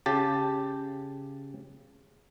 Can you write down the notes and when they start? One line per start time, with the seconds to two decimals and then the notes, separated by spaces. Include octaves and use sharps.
0.06 C#3 G4 A5